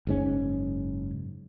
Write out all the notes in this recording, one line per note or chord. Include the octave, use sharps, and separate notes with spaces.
F#1 G#2 C#4